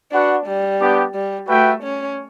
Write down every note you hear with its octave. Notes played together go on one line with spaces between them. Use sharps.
D4 F#4 B4 F#5
G3
B3 D4 G4
G3
A3 F#4 B4 E5 G5
C#4